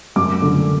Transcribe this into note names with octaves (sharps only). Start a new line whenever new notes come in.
F#2 D6
D3